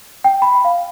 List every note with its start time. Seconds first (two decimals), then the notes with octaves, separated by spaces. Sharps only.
0.24 G5
0.42 B5
0.65 F5